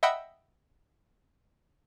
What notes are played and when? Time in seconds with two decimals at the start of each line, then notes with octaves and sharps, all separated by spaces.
0.03 D#5 E5 F#5 G5 B5 E6